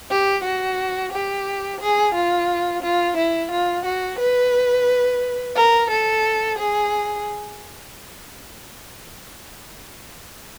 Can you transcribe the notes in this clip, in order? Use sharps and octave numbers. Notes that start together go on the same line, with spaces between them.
G4
F#4
G4
G#4
F4
F4
E4
F4
F#4
B4
A#4
A4
G#4